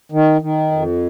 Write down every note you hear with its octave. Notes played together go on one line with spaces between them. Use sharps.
D#3
D#3
F2